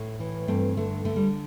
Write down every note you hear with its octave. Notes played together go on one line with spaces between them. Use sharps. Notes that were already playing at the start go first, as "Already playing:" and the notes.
Already playing: A2 A3
E3
G2 A3 C4
D3 A3
D3 A3
G3